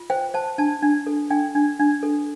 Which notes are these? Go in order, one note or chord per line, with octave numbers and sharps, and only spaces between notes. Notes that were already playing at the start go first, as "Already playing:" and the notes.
Already playing: F4
C5 G5
C5 A5
D4 A5
D4
A4
D4 G5
D4
D4
A4